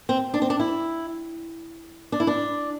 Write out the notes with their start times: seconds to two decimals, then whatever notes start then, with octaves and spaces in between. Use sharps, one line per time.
0.09 C4
0.34 D4
0.42 C4
0.50 D4
0.59 E4
2.12 D4
2.20 E4
2.27 D4